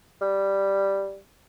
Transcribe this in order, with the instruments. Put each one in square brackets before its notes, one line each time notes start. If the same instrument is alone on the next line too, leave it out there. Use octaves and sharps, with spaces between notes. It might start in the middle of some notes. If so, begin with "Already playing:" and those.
[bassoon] G3